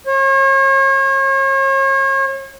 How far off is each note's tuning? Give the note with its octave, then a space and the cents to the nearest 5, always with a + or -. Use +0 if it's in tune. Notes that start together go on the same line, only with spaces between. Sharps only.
C#5 -40